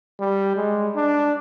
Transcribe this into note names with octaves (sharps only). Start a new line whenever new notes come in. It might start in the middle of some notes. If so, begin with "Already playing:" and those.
G3
G#3
D4